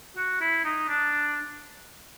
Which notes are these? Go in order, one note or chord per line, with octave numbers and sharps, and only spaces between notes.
F#4
E4
D#4
D4